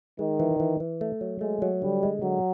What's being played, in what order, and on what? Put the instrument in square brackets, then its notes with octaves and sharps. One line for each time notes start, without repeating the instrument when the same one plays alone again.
[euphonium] D#3 [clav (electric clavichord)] G#3
[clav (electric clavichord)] E3
E3
E3
A3
F#3
[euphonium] G#3 [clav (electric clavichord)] A3
[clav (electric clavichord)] F#3
[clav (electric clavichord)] D3 [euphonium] G3
[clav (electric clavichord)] G#3
[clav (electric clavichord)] D3 [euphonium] F#3